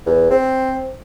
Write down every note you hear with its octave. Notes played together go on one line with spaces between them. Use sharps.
E2
C4